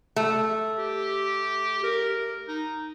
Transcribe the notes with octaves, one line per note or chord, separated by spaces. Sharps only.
A3
G4
A#4
D#4